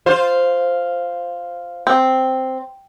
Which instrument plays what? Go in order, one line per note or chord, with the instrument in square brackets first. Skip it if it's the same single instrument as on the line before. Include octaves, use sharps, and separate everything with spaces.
[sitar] F4 C5
[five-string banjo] C4